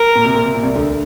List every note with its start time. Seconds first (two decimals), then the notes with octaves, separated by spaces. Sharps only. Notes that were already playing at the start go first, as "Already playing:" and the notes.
Already playing: A#4
0.16 A#2
0.25 C3
0.35 A#2
0.45 C3
0.55 A#2
0.63 C2 C3
0.75 D2 D3